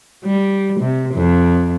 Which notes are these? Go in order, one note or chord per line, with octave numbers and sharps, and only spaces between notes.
G3
C3
F2